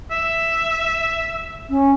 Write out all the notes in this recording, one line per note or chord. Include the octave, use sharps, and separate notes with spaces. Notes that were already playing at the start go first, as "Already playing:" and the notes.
E5
C#4